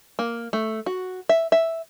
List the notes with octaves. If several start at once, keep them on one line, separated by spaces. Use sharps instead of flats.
A#3
A3
F#4
E5
E5